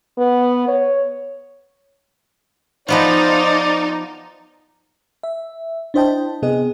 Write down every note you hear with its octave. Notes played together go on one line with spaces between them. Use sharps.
B3
C#5
F3 B3 D#4 F4 C5 D5
E5
D4 E4 C5 D#5 G5 A5
C3 B3 G#4 D#5